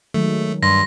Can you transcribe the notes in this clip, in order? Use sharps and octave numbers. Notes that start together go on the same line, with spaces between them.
D#3 F#3 G#3 A3
G2 C6 A#6